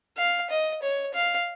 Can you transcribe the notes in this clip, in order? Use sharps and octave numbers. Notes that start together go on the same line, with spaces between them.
F5
D#5
C#5
F5